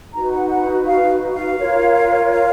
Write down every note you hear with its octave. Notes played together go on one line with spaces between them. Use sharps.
D#4 F#4 B4 A#5
F#5
F#5
F5
F5
F4 A#4 C#5
F5